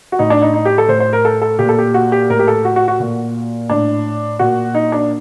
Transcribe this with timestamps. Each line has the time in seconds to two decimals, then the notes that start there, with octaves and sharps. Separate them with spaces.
0.12 F#4
0.19 A2 D#4
0.30 D4
0.42 D#4
0.54 D#4
0.65 G4
0.78 A4
0.89 A2 C5
1.00 C5
1.13 A#4
1.25 A4
1.42 A4
1.59 A#2 G4
1.69 A4
1.79 G4
1.94 F#4
2.12 G4
2.30 A2 A#4
2.39 G4
2.48 A4
2.65 F#4
2.76 F#4
2.88 F#4
3.00 A#2
3.70 A2 D4
4.39 A#2 F#4
4.74 D#4
4.92 D4